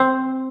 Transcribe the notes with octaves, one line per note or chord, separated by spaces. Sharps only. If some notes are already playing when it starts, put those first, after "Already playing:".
Already playing: C4